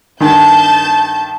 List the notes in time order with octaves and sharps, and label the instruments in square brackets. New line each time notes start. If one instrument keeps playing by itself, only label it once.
[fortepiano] G2 D#3 [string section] A5 G6